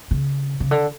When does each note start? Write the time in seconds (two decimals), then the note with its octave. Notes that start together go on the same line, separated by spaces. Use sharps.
0.11 C#3
0.60 C#3
0.71 D3